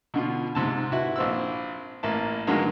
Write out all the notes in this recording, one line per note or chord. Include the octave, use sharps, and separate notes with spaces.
B2 D3 F4
G#2 C3 A5
E4 F#4 B4
A#1 C4 E6
A1 A#3 E4 A5
G2 D3 D#3 F#3 G#3 A#3